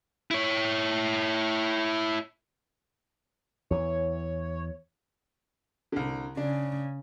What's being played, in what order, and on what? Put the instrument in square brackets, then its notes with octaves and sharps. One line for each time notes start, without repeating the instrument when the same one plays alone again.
[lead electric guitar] E4 C#5
[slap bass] E2 E3 [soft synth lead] C#5
[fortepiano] C2 D3
[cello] C#3 [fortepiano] D4